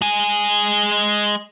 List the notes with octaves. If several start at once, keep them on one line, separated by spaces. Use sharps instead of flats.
G#3 G#4